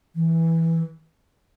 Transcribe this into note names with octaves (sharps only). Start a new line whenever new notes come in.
E3